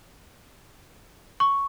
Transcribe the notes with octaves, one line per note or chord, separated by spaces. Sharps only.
C#6